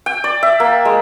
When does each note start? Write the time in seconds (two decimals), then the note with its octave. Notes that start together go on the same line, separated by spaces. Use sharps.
0.06 G5
0.24 D5
0.43 E5
0.60 A#3
0.85 G#3